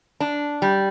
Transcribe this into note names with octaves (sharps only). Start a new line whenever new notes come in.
D4
G3